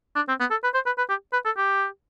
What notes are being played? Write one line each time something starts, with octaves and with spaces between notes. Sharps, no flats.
D4
C4
B3
A4
B4
C5
B4
B4
G4
B4
A4
G4